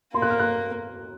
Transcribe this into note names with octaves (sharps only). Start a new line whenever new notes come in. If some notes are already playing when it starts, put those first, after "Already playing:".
A#3 C6
F#6
F6
F#6